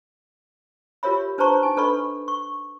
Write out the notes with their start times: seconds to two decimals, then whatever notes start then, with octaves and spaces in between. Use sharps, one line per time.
1.03 F4 G4 A#4 C#5 E5 B5
1.38 D4 B4 C5 A5 A#5 C#6
1.63 D#4 G#5
1.77 D4 A4 B4 D#5 B5 C#6
2.28 C#6